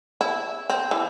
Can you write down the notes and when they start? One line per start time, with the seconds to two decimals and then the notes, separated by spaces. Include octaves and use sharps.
0.21 E4
0.70 C4
0.91 E3